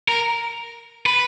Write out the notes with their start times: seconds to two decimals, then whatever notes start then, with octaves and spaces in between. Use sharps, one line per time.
0.08 A#4
1.06 B4